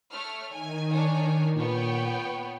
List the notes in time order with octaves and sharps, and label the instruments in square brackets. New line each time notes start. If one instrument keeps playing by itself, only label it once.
[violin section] A3 C#5 F6
[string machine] D#3 [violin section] G#5
[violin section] D4 C#5 G#5
[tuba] A#2 [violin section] B3 C#5 [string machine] G5